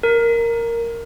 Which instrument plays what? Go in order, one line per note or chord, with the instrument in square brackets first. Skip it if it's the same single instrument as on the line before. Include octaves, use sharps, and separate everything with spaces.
[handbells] A#4